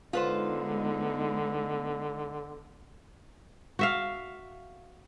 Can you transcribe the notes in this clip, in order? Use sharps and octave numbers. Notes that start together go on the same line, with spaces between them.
D3 G#3 B3 D#4 F4 B4 C5
F#4 E5 F5